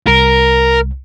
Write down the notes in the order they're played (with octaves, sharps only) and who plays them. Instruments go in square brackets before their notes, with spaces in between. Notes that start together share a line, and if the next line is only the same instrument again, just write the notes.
[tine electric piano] C2 [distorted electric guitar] A#4